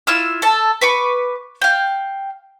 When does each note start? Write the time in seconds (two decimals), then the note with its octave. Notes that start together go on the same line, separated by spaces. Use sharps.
0.07 E4 F4 E6 F6
0.42 A4 A5
0.81 B4 C#6 D6
1.61 F5 G5